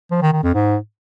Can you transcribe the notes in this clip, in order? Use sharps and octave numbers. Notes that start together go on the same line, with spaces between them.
F3
D#3
D#3
F2
G#2